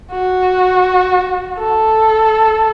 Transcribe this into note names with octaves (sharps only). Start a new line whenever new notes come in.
F#4
A4